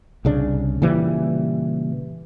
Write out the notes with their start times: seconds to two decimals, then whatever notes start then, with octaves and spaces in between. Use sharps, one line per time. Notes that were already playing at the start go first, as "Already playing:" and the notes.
0.25 C2 C#3 D4
0.82 A#2 C#3 E3 G3